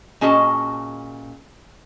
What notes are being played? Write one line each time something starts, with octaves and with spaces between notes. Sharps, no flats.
A#2 C#4 F#4 G#4 D#5 A5